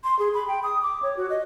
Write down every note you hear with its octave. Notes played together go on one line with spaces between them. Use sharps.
C6
G#4
B5
G5
D#6
D6
C#5
F#4
D#5